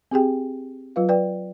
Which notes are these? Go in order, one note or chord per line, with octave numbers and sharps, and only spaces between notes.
C4 G4 G#4 G5
F#3 F4 B4 F5
B4 D5 G5